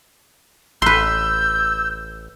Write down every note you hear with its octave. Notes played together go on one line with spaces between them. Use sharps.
A1 B4 C6 E6 G6